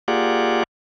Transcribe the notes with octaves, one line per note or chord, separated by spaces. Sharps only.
A#3 F4 G4 G#4 D5 F#5